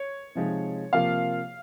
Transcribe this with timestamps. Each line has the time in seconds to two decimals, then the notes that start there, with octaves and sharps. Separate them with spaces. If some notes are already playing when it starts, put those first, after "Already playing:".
Already playing: C#5
0.35 C3 F3 G#3 D#4
0.93 C3 F3 A#3 F4 F5